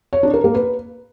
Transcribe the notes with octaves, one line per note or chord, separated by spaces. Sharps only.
C#5
D4
A#4
A#3
B4